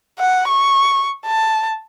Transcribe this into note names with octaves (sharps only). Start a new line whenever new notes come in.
F#5
C#6
A5